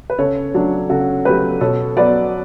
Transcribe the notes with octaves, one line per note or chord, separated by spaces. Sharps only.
B4
C#3 A4 C#5
F#3 A3 D4
C#3 F#4 A4
F#3 A3 G4 B4
B2 A4 C#5
F#3 B3 B4 D5